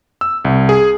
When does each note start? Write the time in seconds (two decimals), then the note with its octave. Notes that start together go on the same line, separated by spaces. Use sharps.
0.21 E6
0.45 C2
0.69 G#4